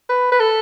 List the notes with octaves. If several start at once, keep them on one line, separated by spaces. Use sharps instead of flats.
B4
B4
A4